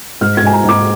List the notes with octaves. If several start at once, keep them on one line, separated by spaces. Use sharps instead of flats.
G#2 F6
G#6
G#2 G#5
A#5
G#2 D6